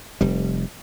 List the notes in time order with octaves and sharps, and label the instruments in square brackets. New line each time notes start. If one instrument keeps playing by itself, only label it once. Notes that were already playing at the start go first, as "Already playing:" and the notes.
[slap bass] F1 G3